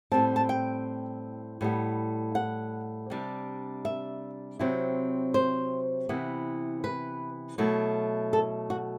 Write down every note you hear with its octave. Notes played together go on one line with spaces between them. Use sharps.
A2 G3 C4 A5
A5
G5
A2 G3 B3
F#5
C3 G3 D4
E5
C3 F#3 C4 E4
C5
C3 E3 B3 E4
B4
B2 F#3 A3 E4
A4
F#4